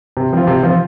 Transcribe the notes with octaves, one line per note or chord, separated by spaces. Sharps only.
C3
F3 C4 F4
C3
F3 C4 F4